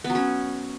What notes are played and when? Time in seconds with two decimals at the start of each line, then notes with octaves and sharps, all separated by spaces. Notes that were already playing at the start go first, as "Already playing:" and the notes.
0.04 B3
0.10 F#3
0.15 C#4